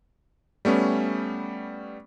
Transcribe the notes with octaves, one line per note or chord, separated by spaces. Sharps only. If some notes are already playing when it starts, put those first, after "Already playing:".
G3 A3 B3 C#4